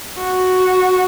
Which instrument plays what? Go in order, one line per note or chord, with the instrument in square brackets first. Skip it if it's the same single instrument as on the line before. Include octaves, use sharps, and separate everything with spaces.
[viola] F#4